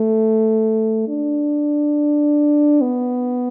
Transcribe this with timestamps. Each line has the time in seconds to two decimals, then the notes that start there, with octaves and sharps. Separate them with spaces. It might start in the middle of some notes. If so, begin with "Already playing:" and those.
Already playing: A3
1.08 D4
2.81 B3